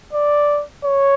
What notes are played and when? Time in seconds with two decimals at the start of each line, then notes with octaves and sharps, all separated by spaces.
0.13 D5
0.84 C#5